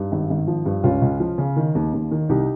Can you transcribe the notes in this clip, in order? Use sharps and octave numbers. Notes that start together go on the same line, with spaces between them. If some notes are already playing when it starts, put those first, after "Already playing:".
Already playing: G2 D#4
G#1
G#1
F3
G2
C#2 C#4 F4
C#2
F3
C#3
D#3
D#2
D#2
D#3
C2 D#4 G4